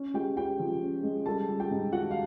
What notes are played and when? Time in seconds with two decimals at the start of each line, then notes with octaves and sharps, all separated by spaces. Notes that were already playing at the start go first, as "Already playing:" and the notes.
Already playing: C#4
0.14 G#3 G4 G5
0.37 C#4 G4 G5
0.60 F3
0.82 C#4
1.03 G#3
1.26 G3 A4 A5
1.49 G3
1.60 G4 G5
1.71 G#2
1.93 D#3 F#4 F#5
2.11 F5